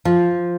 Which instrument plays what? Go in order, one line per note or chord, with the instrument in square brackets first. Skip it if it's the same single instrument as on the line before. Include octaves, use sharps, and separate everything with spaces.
[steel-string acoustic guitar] F3